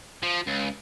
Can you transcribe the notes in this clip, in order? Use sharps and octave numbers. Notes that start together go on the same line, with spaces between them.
F3
C#2